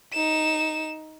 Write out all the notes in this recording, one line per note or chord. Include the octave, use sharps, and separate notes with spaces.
D#4 E7